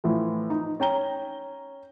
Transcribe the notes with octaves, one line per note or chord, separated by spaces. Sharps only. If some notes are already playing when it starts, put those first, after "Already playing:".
A2 E3 F3
D#4
C#4 G5 A#5 G7